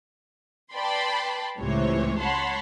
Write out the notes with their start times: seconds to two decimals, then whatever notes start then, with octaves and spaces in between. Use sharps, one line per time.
0.73 B4 D5 G5 A5 B5 C6
1.59 C#2 A2 C3 E3 C5 C#5
2.20 C#5 F#5 A5 B5 C6